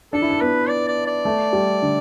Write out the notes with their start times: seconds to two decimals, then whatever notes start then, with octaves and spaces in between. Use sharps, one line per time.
0.13 D4 A4
0.22 E4
0.30 D4
0.41 B3 B4
0.69 D5
0.88 D5
1.06 D5
1.25 A3
1.53 G3
1.82 D3